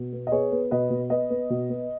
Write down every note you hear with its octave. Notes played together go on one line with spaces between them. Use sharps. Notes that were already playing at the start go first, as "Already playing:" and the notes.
Already playing: B2
B3
D#5
B3 G#4 C#5
B3
B2 B4 D#5
B2
B3 B4 D#5
B3
B2
B3